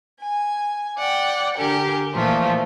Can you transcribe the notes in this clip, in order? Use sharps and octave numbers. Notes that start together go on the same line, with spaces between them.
G#5
D5 F#5 G5
D3 G4 A#4 G#5
A#2 E3 F3 A3 F4